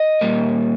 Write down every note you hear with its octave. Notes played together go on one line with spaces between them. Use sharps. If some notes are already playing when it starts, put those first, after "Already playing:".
Already playing: D#5
A#2 G3 A#3